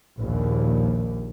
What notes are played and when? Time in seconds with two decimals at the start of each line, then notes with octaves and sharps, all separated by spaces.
0.19 A#1 D#2